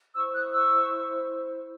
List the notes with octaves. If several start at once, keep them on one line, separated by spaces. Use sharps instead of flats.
E4 C5 C#6 E6
D#6 F#6
C#6 E6